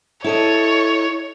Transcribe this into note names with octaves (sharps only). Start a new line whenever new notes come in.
E4 A4 C#5 D#5